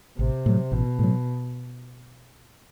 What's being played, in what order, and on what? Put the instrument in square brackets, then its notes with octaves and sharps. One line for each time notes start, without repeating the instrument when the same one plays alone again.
[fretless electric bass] A1 [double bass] C3
[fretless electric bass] A2 F#3
[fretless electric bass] A1 [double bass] B2
[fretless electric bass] A2 F#3